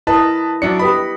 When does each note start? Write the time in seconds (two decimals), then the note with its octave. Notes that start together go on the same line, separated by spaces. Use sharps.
0.07 E4 A#4 B4 D#5 A5
0.62 F#3 D4 D5 E5 C#7
0.79 G4 B4 D#5 B5